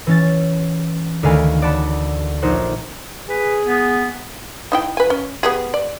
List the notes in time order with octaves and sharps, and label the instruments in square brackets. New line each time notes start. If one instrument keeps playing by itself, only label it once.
[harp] E3 C#4 A6
D2 D#3 F5 G#5 B5
D5 F#5 A5 B5
A#1 D#4 C5 F#5
[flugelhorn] G#4 [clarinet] B4
[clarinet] B3
[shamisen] D#4 E4 G5
B4 G#5
C#4
B3 G4 G#4
D5